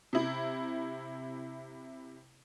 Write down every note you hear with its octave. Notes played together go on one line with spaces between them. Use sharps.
C3 E4